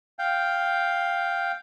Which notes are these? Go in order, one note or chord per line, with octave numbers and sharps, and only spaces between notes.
F5 G5